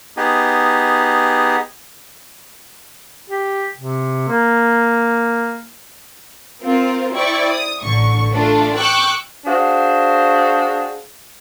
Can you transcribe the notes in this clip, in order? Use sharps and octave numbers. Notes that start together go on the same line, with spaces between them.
B3 D#4 G4 G#4
G4
C3
A#3
C4 F4 A#4 C5
E4 C5 D5 G5 C#6
D#6
A1 D3 C#6
A3 D4 F4 A4
G5 C#6 D6 E6 F#6 G6
D4 F#4 G#4 C5 F5